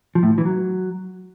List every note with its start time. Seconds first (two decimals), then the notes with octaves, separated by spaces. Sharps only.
0.15 F3
0.23 A2
0.30 F3
0.38 E3
0.45 F#3